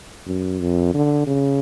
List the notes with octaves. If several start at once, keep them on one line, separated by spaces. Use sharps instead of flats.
F#2
F2
D3
C#3